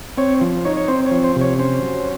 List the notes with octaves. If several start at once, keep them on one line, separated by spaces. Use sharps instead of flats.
C4 C#5
F3
D#4 C#5
C#5
C4 C5
C#5
F3
C5
C3
C#5
C#4 C5
F#3